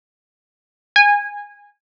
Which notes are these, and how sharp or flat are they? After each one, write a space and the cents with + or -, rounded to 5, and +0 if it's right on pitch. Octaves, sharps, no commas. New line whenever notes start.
G#5 -20